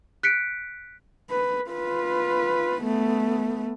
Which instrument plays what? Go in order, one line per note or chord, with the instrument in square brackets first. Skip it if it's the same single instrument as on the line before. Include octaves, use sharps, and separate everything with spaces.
[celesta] F#6 B6 C#7 D7
[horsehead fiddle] B4
F4 B4
A3 B3